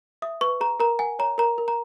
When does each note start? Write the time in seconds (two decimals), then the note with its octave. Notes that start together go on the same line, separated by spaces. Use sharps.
0.22 E5 D#6
0.41 B4 C#6
0.61 G#4 A#5
0.80 A#4 A#5
0.99 F#5 G#5
1.19 C#5 A#5
1.38 A#4 A#5
1.58 A#4
1.68 A#5